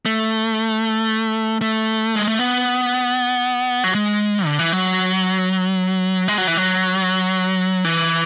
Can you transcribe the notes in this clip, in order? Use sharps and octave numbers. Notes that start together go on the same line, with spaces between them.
A3
A3
G#3
A3
B3
F#3
G#3
D3
E3
F#3
G#3
F#3
E3
F#3
E3